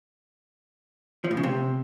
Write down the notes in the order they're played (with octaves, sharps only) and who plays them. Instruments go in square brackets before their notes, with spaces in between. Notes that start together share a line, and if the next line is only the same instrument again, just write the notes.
[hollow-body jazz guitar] F3
A2
C#3
C3